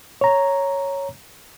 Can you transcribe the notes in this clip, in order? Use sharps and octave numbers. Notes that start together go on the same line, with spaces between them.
C#5 A#5